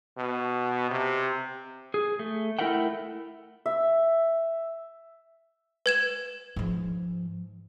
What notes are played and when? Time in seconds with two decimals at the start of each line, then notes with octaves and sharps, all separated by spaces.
0.18 B2
0.91 C3
1.94 G#4
2.19 A3
2.59 A3 E4 A#4 E5 F#5 G5
3.66 E5
5.86 B4 G#6 E7
6.56 G#2 F3